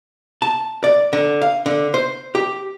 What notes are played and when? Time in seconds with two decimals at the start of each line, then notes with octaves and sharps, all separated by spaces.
0.42 A5
0.84 D5
1.13 D3
1.42 F5
1.66 D3
1.94 C5
2.35 G4